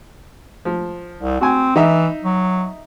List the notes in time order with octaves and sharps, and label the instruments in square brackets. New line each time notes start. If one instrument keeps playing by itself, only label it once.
[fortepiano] F3
[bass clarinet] C2
[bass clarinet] C4 [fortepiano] F#4 G#5
[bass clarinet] E3 [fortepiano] D#4 E5
[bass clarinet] F#3